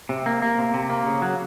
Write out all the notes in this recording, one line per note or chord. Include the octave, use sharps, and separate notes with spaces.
C3
A#3
A#3
C3
C3
A#3
C#3
F#3